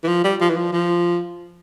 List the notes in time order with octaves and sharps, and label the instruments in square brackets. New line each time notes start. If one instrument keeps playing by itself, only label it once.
[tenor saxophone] E3
F3
G3
F3
E3
F3
F3